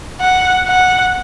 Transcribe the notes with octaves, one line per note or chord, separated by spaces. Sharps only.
F#5
F#5